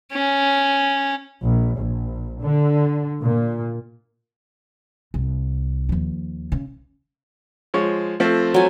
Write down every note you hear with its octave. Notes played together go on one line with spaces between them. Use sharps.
C#4
A#1
A#1
D3
A#2
C2
D#2 F3
C#3
F3 G#3 C#5
F3 A3 C4
F#3 G#5